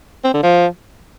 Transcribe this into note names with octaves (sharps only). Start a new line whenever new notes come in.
C4
D3
F3